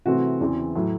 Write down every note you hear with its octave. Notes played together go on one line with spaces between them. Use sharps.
C3 E3 A3 C4 F#4
E2 C#3 E3 C4
A2 F#3 A3